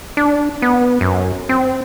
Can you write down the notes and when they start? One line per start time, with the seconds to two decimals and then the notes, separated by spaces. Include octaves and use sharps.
0.17 D4
0.62 B3
1.01 F#2
1.49 C4